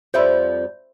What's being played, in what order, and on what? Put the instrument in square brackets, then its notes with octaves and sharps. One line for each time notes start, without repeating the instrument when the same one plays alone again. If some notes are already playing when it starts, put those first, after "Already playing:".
[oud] F2 F3 G3 [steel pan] C5 E5 B5 [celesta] D5 G6